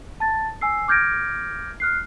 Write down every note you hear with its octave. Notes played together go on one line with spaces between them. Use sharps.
A5 A6
G#5 E6 C7
D6 F6 G6 G#6 A#6 D7
F6 F#6 C7